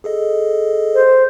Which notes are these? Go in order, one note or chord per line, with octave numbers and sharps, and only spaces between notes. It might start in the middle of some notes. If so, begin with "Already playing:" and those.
G#4 A4 D#5
C5